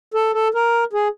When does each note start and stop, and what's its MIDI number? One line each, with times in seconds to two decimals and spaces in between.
0.14 0.33 69
0.33 0.48 69
0.54 0.84 70
0.93 1.08 68